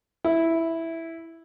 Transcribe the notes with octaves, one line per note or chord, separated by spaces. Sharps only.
E4